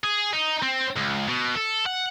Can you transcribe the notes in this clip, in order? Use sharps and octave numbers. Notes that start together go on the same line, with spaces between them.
G#4
D#4
C4
C#2
B2
A4
F#5